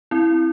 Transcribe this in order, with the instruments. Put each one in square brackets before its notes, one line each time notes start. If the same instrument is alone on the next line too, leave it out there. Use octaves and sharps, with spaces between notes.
[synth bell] C4 E4